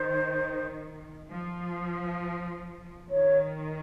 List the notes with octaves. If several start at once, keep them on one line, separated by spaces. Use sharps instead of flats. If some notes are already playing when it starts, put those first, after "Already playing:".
Already playing: D#3 C5
F3
D#3 C#5